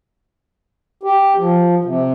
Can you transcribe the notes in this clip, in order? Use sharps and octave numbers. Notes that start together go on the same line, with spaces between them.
G4
F3
C3